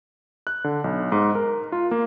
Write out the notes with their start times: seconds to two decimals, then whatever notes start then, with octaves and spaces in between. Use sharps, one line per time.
0.47 F#6
0.64 D3
0.84 B1
1.12 G#2
1.35 A#4
1.72 F4
1.91 A#3